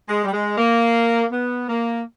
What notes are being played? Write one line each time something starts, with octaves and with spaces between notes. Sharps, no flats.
G#3
G3
G#3
A#3
B3
A#3